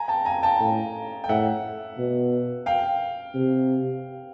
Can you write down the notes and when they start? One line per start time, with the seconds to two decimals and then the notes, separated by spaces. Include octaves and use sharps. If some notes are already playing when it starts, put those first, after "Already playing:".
Already playing: G#5 A#5
0.08 G5 A5
0.25 G#5 A#5
0.43 G5 A5
0.60 A2
1.24 G5
1.29 A2 E5 F#5
1.98 B2
2.66 F5 G5
3.35 C3